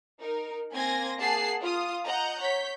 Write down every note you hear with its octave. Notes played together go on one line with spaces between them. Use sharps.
D#4 A#4
A#3 C4 G#5 C6 G#6 A#6
A#3 G#4 F#5 A5 C7
F4 D#6
D#5 F#5 A#5 G6
C#5 G6 B6